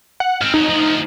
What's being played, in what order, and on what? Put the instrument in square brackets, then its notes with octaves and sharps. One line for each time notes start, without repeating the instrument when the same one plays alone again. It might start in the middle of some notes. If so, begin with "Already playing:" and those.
[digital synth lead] F#5
[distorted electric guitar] G#2 C4 [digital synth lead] F6
[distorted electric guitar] F2 F#3 [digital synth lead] D#4
[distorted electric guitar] D2 F3